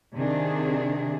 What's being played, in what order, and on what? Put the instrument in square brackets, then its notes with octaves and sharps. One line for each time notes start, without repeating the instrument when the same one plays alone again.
[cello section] C3 D#3 D4 G#4